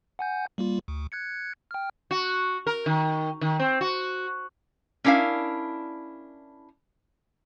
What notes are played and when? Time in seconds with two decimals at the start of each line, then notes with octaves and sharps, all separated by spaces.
0.19 F#5 G#5 G6
0.58 G3 A#3 F4
0.88 D2
1.12 F#6 G#6 C#7
1.71 G5 F6
2.11 F#4
2.67 A#4
2.86 D#3
3.41 D#3
3.59 C4
3.81 F#4
5.04 C#4 D4 E4 A#4 F5